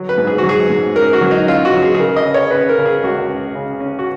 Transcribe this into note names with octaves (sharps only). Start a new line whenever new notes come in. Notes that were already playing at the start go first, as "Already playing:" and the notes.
Already playing: F#3
B4
G#2
G#4
F#4
F#3
G#4
G#2
C#4 A#4
F#4
F#3
D#4
C#4 F4
F#4
F#3
G#4
G#4
C#3 A#4
D#5
C#3
C#5
C#4 B4
A#4
C#3
G#4
C#2 F#4
C#4
C#3
C#4
F#4